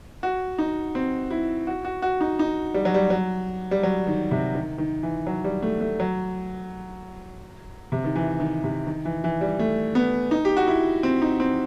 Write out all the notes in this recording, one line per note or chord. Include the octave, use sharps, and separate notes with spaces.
F#4
D#4
C4
E4
F#4
F#4
F#4
D#4
D#4
G3
F#3
G3
F#3
G3
F#3
D#3
C3
D#3
D#3
E3
F#3
G3
A3
A3
F#3
C3
D#3
E3
D#3
C3
D#3
E3
E3
G3
A3
B3
D#4
G4
F#4
E4
C4
D#4
C4